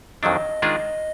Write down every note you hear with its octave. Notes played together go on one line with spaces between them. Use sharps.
F2 D#3 F#3 D4 D#5
D#3 G#3 D4 F4 G#4